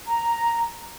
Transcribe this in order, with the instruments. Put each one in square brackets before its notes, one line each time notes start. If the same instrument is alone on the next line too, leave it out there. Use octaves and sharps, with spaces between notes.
[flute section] A#5